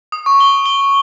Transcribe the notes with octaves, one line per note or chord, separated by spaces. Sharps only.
D#6
C#6
G7
G7